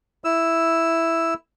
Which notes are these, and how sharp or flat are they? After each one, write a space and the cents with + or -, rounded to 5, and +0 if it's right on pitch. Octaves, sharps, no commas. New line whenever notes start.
E4 +0 E6 +0